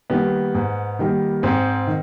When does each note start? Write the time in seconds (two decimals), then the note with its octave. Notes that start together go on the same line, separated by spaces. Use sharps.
0.10 D#3 G3 A#3 B3
0.55 G#2
0.99 D#3 G3 A#3
1.43 G#2 C4
1.87 D#3